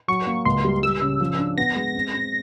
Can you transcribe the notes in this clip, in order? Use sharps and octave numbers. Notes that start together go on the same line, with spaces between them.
F#3 C#6
A#3
C#2 C6
G3
G3 E6
C#3
F3
D4
B3 A#6
G#3
C4
C4